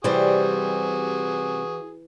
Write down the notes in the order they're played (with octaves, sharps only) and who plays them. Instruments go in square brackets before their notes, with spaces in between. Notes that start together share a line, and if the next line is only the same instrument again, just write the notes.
[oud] C3 G3 [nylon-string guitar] E3 [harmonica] F#4 G#4 [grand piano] C5 D5